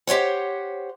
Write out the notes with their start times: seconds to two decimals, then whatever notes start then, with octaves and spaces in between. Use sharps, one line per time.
0.07 G4 C5 C#5 F#5